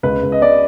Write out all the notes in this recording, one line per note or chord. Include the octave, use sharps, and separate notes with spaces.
C#2 B4
C#2
D#5
C#3 D5